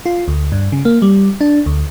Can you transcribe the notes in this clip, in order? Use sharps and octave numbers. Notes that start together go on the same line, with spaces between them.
F4
D2
G2
C#3
A#3
G3
D4
D2